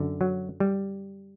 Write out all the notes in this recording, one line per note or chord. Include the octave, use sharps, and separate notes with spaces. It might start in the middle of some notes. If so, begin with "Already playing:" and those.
Already playing: F#2 D3
F#3
G3